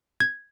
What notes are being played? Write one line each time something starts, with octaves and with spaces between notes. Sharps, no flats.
G#6